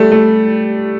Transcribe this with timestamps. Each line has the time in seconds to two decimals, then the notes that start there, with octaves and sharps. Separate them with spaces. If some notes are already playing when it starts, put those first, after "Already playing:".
Already playing: G3 A3
0.12 A3